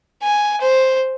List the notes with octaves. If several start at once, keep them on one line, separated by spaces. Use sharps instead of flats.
G#5
C5